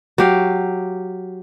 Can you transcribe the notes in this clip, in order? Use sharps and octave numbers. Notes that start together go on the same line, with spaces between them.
F#3 G4 F5